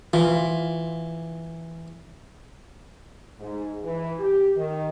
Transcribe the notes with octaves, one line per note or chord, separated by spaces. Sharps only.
E3 F4
G#2
E3
G4
D#3